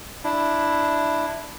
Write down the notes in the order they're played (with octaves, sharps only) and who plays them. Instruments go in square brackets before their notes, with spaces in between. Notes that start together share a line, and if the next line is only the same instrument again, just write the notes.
[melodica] D4 E4